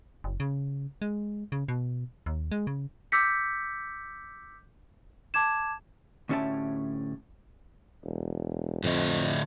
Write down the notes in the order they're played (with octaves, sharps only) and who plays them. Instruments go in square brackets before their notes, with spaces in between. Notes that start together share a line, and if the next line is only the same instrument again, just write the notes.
[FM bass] F#1
C#3
G#3
C#3
B2
D#2
G#3
C#3
[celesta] D6 E6 G6 A#6 B6 C#7
A5 D6 G#6 E7
[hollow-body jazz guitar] D2 A2 C#4 G4 E5 A5
[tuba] E1
[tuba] F2 [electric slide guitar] A2 D3 D#5